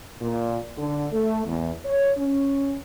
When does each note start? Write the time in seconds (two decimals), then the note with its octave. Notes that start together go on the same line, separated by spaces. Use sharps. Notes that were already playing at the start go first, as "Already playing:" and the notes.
0.22 A#2
0.77 D3
1.12 A3
1.46 E2
1.85 C#5
2.18 C#4